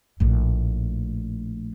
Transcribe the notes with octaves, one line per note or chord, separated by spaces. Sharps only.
A#1 A2